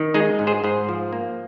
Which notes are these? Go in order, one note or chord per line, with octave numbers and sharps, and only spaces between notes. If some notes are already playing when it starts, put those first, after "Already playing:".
Already playing: D#3
G#3 D#4 G#4
G#2
G#4 C5
G#2 G#4 C5
F3
A#3